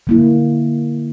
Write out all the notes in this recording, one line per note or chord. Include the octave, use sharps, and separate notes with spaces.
D3 A#3 E4